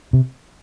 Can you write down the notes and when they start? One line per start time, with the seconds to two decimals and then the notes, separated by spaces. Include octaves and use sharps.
0.13 C3